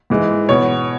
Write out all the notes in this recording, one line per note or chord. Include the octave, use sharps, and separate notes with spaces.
G#2 E3 G#3
B2 B3 C#5